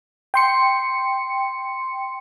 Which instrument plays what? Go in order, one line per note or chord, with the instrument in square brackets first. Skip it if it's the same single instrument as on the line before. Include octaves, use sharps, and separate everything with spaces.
[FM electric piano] G5 C6 C#7